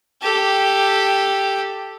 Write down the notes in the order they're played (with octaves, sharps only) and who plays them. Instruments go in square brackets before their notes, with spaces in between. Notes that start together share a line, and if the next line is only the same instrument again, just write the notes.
[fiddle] G4 A4